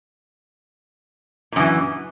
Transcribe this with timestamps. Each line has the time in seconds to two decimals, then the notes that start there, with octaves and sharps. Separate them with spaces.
1.52 A#2
1.56 F#2
1.60 E3